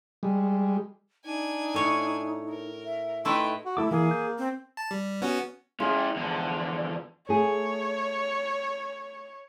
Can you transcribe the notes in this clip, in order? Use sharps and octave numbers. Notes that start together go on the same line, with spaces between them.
G3 G#3
D4 D#4 G#5
A2 C#5
A#4
E5
A3 D#4 E4 B4 G5 C6
F#4
A3 E4 A4 D6
E3 A#3 G#4
G6
C4
A5
G3
B3 C#4 F#4
G#3 C#4 E4 F4 G#4
E2 D3 F3
A3 G#4 C#5